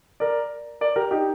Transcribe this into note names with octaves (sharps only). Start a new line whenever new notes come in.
A#4 D5
A#4 D5
G4 A#4
D#4 G4